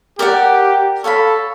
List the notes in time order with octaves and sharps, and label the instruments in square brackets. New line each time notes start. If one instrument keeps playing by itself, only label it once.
[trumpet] G4 [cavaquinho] A#4 D5 F#5
[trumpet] A4 [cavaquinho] C#5 F5 G#5 B5